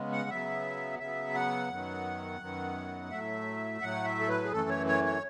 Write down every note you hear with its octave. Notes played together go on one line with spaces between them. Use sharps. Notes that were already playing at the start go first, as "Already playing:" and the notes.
Already playing: C#3 G#3 B3
F#5
C#3 F#3 B3 E5
C#3 F#3 B3 E5
F#5
F#2 D#3 F#3 B3
F#2 D#3 F#3 B3
A2 F#3 A3 E5
A2 F#3 A3 F#5
E5
A4
B4
G#4
F#2 E3 A3 A4
C#5
C#5
C#5